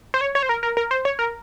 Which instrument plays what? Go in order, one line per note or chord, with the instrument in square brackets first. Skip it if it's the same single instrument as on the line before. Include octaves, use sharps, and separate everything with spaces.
[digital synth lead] C5
C#5
C#5
C5
A#4
A#4
A#4
C5
C#5
A#4